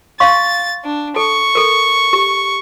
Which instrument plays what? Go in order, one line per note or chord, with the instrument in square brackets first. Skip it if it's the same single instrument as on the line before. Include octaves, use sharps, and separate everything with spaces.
[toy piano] F5 C6 C#6 [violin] A6
[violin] D4
[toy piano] A4 [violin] C#6
[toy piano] A4 A#4
G4